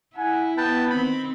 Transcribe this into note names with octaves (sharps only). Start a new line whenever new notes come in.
E4 F#5 G#5
B3 B4 G5 A5
D#3 C4 B5